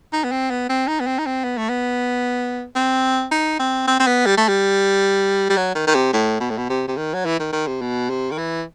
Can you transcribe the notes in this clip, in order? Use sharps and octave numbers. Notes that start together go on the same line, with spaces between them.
D#4
B3
C4
B3
C4
D#4
B3
C4
D#4
C4
B3
A3
B3
C4
D#4
C4
C4
C4
B3
G3
A3
G3
G3
F#3
D#3
D#3
C3
A2
B2
A2
B2
C3
C3
D#3
F#3
E3
D#3
D#3
C3
B2
C3
D#3
E3